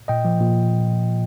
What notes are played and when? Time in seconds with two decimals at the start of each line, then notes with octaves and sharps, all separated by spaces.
0.08 A#2 D#5 G5
0.25 F3
0.40 A#2